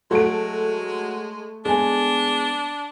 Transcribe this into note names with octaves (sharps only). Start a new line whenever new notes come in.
F#3 G#3 A3 F#4 D7
G#3 B3 D4 G#5